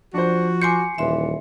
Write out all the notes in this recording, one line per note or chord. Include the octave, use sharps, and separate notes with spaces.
F3 D4 F#4 C5
G#5 C6 D6 G6 C7 C#7
D#1 E3 E5 C6